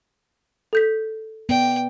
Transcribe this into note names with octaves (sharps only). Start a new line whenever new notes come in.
A4 G6 B6
B3 D5 G5